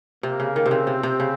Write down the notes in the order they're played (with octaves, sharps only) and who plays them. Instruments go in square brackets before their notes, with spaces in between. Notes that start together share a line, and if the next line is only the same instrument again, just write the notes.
[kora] C3 [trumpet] A#3
[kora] C#3
D#3
C3
[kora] C#3 [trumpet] C4
[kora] C3
C3
C#3